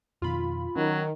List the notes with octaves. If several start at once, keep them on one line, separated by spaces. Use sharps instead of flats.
F2 B2 D#3 F4 B5
D#3 F#3 C#4